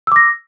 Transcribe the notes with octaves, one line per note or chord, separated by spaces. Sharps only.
D6 E6 A#6